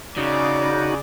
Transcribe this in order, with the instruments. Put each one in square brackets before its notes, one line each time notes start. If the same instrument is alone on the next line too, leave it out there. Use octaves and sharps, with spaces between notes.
[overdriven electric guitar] C#3 [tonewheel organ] D#4 F#4 [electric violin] D5